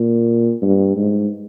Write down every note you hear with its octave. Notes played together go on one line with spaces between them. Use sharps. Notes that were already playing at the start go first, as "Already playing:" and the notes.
Already playing: A#2
G2
G#2